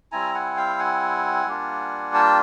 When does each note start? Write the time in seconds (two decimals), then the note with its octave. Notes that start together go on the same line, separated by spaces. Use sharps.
0.12 G3 C4 E4 G#5 A#5
0.34 F#5 G#5
0.57 F5 G5
0.79 F#5 G#5
1.47 G3 A#3 D4 F4
2.14 G5 A5